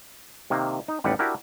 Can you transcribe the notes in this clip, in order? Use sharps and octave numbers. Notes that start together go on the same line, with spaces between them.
C3 D#3 A#3
D#4
A1 D#2 G3 B4 F#5
D4 E4 F#4 G4 A#4